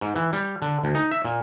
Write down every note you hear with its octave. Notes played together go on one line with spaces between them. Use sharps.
G#2
E3
G3
D3
D2
D#4
E5
A#2